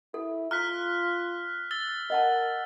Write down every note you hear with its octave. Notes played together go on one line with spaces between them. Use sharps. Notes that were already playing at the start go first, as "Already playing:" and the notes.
E4 A4
F4 A#5 F6 F#6 B6
E6 A6 G7
A#4 D#5 F#5 A5